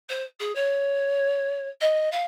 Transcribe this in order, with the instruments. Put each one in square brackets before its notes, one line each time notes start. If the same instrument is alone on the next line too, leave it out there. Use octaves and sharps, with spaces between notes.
[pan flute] C5
G#4
C#5
D#5
F5